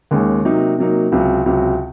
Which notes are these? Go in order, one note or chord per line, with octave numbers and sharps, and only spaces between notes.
D#2 D#3 G#3 C#4
C3 F#3 A#3 D#4
C3 F#3 A#3 D#4
C#2 C3 F#3
C#2 C3 F#3